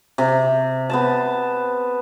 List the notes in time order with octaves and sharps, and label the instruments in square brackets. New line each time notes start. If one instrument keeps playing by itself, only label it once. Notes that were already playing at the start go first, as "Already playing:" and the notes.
[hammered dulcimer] C3
B3 C5 A5